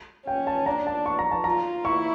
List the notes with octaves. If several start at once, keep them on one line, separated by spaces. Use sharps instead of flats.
C#4 G5
A5
D4 A#5
A5
C#6
A#5
A5
F4 A#5
E4 C#6